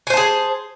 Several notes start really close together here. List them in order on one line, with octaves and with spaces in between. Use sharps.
G#5 C5 A5 G#4